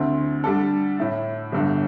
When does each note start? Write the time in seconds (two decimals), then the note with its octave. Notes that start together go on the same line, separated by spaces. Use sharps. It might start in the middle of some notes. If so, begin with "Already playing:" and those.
Already playing: D2 D3 C4 E4
0.44 D3 G3 D4 A4
0.99 A2 A3 E4
1.52 G1 G2 D3